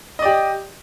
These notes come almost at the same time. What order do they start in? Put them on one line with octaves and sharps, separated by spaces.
D#5 D5 G4